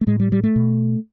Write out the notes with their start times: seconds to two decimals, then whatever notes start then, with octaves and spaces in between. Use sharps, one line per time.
0.01 A3
0.07 A2 G#3
0.20 G3
0.32 G3
0.44 A3
0.56 B2